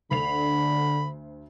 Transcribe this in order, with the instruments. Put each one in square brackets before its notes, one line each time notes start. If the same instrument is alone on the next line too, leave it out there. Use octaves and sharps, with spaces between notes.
[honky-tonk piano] D2 C7 F7 [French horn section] D3 [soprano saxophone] B5